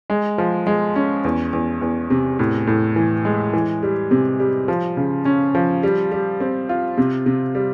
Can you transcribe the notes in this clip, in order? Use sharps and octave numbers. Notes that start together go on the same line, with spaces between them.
G#3
F3
G#3
C#4
E2
E2
E2
C3
A2
A2
E3
G#3
E3
G3
C3
G3
F3
C#3
C#4
F3
G3
G3
C4
F4
C3
C3
G3